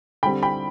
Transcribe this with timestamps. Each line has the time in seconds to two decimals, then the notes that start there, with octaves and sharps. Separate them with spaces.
0.23 D3 G3 C4 G5 B5
0.43 G5 B5